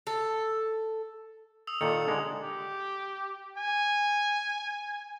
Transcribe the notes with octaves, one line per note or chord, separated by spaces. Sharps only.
A4
D#6 E6 F7
A#2 D#3 A4 C#7
D3 G#3
G4
G#5